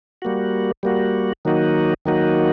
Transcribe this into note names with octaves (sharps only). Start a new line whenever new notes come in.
G3 A#3 F#4
G3 A#3 F#4
D#3 F#3 A#3 D#4 F#4
D#3 F#3 A#3 D#4 F#4